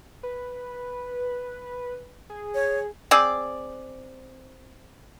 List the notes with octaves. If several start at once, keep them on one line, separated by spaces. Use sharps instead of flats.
B4
G#4
C#5
C4 G#4 D5